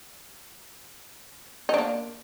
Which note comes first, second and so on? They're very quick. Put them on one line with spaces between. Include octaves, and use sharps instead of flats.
D#4 D4 A#3